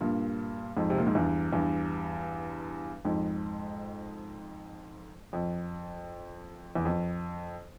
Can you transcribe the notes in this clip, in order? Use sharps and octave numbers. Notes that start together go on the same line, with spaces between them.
G2 A#2
F2 G#2
C3
A#2
G#2
E2 G2
E2 G2
F2 G#2
F2
E2
F2